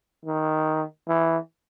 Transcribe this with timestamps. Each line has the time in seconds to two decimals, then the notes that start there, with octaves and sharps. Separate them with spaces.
0.25 D#3
1.08 E3